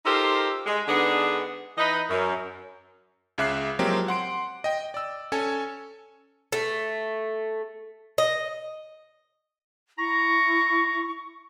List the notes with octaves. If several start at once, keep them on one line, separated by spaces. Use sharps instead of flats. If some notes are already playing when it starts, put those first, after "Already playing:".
D#4 F4 G4 A4 A#4 C5
G#3
D3 G#3 B3 D4 D#4 G#4
E3 D#4 B4 D#5
F#2
C#2 C#3 E5 D6 F#6 C7
F3 F#3 G#3 A#3 C4 G4
F#5 C6 D7
D#5 G5
D5 E6
C#4 A4 C#5 G#5
A3
D#5
E4 A#5 C#6